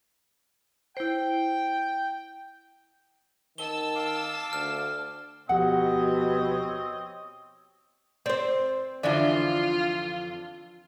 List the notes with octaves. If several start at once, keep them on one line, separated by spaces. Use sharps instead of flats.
E4 C5 G5
D#3 A5 E6 G7
F5 D6
D2 F6
D2 B2 F3 C4 G4 C#5 D#5 F#5
C4 C5 D5
F2 D3 E3 F4 D5 E5